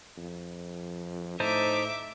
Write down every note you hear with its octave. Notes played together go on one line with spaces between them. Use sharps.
F2
A2 D#4 C5 E5 A5 D6